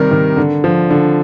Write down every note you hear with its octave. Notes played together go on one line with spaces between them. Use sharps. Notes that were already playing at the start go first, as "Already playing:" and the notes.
Already playing: C3 D#3 G3 A#4
D#3
D3
F3
D3